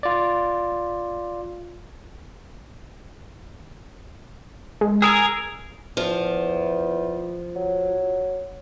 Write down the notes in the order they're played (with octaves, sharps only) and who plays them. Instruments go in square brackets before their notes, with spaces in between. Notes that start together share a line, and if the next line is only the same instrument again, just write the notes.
[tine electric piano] F4 D5
[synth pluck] G#3
[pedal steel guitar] G#4 A#4 G#5 [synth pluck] D#6 E6
[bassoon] E2 [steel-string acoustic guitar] F3
[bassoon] F#3